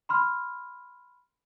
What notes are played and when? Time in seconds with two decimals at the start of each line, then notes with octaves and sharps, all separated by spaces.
0.09 B5 C6 F6